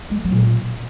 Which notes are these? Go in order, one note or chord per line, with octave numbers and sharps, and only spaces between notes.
G#3
D3
F#3
A#2